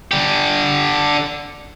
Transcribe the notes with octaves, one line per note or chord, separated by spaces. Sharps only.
D3 G4